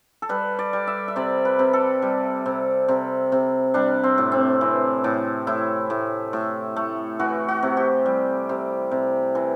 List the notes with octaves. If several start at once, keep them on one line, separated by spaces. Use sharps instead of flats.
A4
G3 B4
D5
G3
E5
E5
C3 D5
B4
C3
A4
G3
C3
C3
C3
G3 D4
C4
A2
C4
E3
A2
A2 E4
A2
A2
A3
E3 F#4
F#4
C3
G4
G3
C3
C3
E3